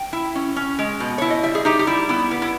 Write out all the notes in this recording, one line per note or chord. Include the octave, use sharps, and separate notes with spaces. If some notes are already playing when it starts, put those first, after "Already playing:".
Already playing: G5
E4
C#4
C#4
G#3
B2
E4 C#5
D#5
G3 E5
G#4
D#4 G4
G4
G3 E4
B3 E4
B3
E4